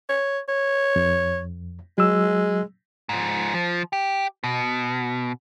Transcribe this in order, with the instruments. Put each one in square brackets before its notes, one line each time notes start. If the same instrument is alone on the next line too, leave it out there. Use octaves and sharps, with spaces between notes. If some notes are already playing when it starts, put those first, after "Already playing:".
[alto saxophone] C#5
C#5
[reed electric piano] F2
[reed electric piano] F#3 E6 [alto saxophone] G#3
[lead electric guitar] G#2 F3
F3
G4
B2